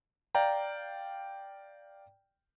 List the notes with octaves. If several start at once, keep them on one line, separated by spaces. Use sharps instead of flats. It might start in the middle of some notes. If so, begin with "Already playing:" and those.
D5 F5 G5 A#5